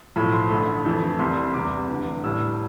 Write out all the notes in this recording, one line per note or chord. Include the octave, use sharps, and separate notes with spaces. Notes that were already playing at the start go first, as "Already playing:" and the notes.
B1 A2 F3 A3 B5
C6
A1 G2 D3 A3 B5
F2 E3 A3
C2 C3 G3 C6
C6
E2 C3 G3 D6
F1 E2 D3
A1 A2 G3 E6